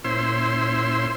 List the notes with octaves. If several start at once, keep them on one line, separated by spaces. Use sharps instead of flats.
A#2 C#4 E4 C5 C6 E6